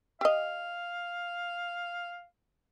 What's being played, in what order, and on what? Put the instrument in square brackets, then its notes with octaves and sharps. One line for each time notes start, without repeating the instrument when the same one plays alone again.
[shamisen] G4 D#5 [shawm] F5